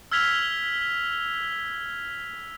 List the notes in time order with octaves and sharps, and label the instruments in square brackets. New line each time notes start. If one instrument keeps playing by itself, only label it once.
[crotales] E6 F6 G#6 B6 F7 G7